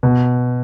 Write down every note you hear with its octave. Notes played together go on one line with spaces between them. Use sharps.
B2